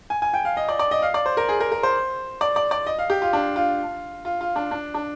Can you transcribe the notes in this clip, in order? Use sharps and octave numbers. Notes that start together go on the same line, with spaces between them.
G#5
G#5
G5
F5
D#5
D5
D5
D#5
F5
D5
C5
A#4
G#4
A#4
A#4
C5
D5
D5
D5
D#5
F5
G4
F4
D4
F4
F4
F4
D4
D4
D4